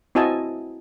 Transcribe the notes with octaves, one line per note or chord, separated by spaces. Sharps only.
C4 E4 F#4 D#5 G#5 A5